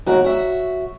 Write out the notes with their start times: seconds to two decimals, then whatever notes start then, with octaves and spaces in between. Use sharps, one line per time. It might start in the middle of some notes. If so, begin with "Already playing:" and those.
0.06 D#2 F#4 A#4
0.24 F#4 E5